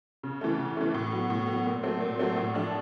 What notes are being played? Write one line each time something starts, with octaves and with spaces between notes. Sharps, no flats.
C#3
E3 A3
C#3
E3 A3
A2
F#3 B3
A2
F#3 B3
A#2
F#3 A3 C4
A#2
F#3 A3 C4
A2
F3 A3 D4